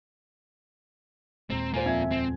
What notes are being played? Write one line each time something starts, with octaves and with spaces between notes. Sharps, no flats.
D#2 A#2 G#3 C4 A#5
A#3 F4 C5 G#5
F2 E5 G#5 G#6
C4